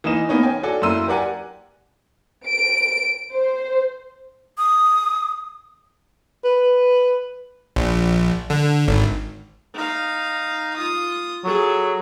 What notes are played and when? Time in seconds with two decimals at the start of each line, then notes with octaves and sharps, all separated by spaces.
0.04 E3 A#3 D#4 D#5 E7
0.29 A#3 B3 D#4 C#5
0.43 C#4 G5 G#5
0.63 F#4 A4 D5 G#5
0.82 F#2 A#3 E4 C6 E6 D#7
1.07 G4 A#4 D5 F#5 G#5
2.46 D7
3.32 C5
4.58 D#6
6.45 B4
7.76 A#1
8.50 D3
8.88 G#1
9.74 D#4 F5
10.76 F4 D#6
11.44 F#3 G#4 A4